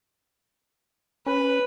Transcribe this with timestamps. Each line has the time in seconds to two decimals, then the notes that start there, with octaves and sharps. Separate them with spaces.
1.26 C#4 B4